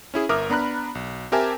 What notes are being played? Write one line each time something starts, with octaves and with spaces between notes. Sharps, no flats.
C#4 E4 G#4
G1 A#4 E5 D6 D#6 F6
B3 D4 A#5 B5 F#6
B1
C4 G4 A#4 E5 G#5 A5